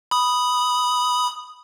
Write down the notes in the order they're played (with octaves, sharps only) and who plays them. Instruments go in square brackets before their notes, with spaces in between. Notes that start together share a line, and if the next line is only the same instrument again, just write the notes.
[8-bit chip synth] B5 D#6